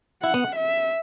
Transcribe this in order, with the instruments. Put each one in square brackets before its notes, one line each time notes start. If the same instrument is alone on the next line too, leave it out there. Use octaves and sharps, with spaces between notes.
[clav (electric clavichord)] E4 [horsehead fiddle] F#5
[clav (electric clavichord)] B3
[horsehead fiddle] E5